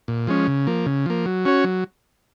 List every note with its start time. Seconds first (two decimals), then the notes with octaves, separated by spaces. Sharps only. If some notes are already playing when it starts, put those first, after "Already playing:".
0.08 A#2
0.27 F3 G#3 C#4
0.48 C#3
0.67 F3 A#3
0.86 C#3
1.06 F3 A#3
1.26 F#3
1.45 C#4 F#4 C#5
1.64 F#3